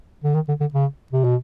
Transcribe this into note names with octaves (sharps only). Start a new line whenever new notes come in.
D3
D#3
D3
D3
C#3
C3
B2